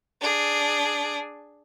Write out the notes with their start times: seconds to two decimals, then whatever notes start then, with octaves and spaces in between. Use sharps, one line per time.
0.21 D4 G#4